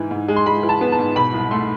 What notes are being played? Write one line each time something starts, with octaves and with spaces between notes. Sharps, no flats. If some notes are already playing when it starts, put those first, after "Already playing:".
Already playing: G#2 E3
G#2
G#3
C6
G#3 B5
E3
A5
B3
A5
G#2
B2 B5
C2
A3 C6